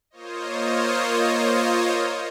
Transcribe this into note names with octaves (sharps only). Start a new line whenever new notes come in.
A#3 F4 C5 C#5 D#5